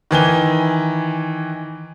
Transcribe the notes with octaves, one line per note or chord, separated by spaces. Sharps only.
D#3 E3 G#5 G7